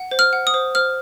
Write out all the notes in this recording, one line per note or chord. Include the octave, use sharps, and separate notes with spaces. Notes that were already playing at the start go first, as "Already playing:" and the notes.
Already playing: F#5
C5
F6
F#5
D#6
C5
C5 F6